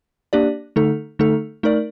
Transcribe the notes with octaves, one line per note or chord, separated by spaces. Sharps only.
A#3 D4 G4 D5
D3 A3 D#4 A4
D3 A3 D#4 A4
A3 D#4 A#4 D5